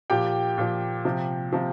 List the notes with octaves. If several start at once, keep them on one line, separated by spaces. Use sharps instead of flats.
A#2 F3 G4 G5
A#2 F3
C3 F3
C3 F3